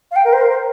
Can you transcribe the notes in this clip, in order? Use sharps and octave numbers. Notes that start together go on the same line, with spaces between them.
F5
G5
A#4
C5
A#4
C5